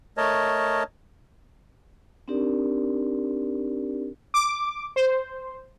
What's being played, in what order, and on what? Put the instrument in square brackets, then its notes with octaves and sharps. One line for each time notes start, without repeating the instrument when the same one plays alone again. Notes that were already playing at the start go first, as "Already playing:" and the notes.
[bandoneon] A3 A#4 C#5 D#5 A5
[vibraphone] C4 D4 D#4 G4 A#4 D5
[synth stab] D6
C5